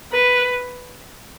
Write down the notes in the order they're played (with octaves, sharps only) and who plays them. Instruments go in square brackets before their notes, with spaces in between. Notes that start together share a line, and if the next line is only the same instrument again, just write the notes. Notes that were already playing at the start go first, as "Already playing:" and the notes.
[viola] B4